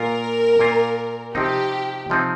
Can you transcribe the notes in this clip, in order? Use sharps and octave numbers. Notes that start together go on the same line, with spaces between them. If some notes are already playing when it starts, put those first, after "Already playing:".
Already playing: A#2 A#3 F4 A#4
A#2 A#3 F4
C3 F3 C4 D#4 G4
C3 F3 C4 D#4